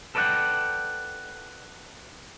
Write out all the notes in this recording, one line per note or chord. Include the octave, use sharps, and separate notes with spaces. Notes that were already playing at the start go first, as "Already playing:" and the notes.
A4 B4 D5 D#5 F#5 G5